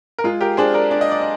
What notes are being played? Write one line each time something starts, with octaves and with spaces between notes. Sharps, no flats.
A#4
G#3 F4 G#4
G4 A#4
D4 G#4 C5
A#4 D5
D4 D5
D#5
D5
D#5